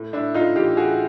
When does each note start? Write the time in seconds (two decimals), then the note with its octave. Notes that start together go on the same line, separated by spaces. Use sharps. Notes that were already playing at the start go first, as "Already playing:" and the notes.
Already playing: A2
0.13 A2 D4 E4
0.34 A2 D#4 F4
0.55 E3 F4 G4
0.76 E3 F#4 G#4